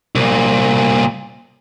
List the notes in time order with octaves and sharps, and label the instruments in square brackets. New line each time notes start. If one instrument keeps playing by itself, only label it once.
[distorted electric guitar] C2 A#2